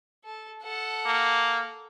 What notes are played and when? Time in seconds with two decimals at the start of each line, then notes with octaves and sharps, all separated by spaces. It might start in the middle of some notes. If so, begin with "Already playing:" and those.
0.24 A4
0.63 A4 F#5
1.06 A#3